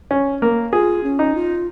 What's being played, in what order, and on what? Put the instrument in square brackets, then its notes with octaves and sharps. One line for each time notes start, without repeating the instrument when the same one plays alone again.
[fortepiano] C#4
A#3
[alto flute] F4 [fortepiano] G#4
[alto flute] C#4
[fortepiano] D#4
[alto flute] F4